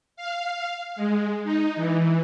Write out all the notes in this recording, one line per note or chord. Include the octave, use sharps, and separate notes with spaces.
F5
G#3
D#4
E3